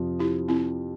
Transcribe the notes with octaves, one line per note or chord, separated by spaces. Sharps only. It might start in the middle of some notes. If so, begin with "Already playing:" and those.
Already playing: F2 C3 F3
E4 G4
C4 E4